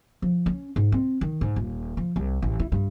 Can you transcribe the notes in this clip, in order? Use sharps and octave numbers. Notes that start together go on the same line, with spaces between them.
F3
C#4
G#2
C4
D#3
G#2
D#1
F3
C2
A1
E4
G2